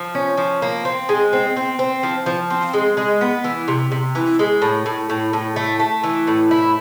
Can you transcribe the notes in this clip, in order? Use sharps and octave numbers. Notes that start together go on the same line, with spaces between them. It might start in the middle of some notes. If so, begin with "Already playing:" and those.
Already playing: F3
C#4
F3
A#3
C4
G#3
C4
C4
C4
F3
F3
C4
G#3
G#3
B3
E3
C3
C3
E3
G#3
A2
A2
A2
A2
A3
A3
E3
A2
E4